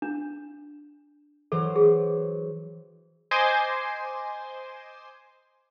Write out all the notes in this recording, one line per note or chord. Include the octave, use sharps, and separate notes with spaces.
D4
E3 F#3 A4 C5
G#4
C5 D#5 G#5 C6 D6